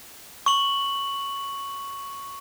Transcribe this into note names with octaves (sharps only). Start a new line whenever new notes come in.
C#6 F#7